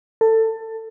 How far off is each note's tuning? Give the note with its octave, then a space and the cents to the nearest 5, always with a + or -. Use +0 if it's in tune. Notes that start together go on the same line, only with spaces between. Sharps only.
A4 +20